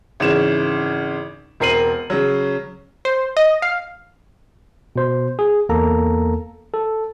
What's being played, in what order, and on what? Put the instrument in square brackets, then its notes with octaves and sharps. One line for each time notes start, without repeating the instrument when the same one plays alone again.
[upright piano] G#1 C#3 E3 E7
E1 C4 A#4 C7 D#7 F#7
C#3 F#3
[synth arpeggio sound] C5
D#5
F5
[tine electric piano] B2 C5
G#4
E2 A#3 A4 A#5
A4